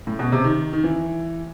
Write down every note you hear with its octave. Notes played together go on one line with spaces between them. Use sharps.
A2
B2
C3
D#3
D#3
E3